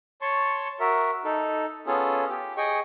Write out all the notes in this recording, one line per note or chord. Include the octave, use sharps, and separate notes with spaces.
C#5 A5 C6 C#6
F#4 A#4 E5
D#4 A4
B3 C#4 F4 G#4 A4
G4
G#4 D#5 G5 C#6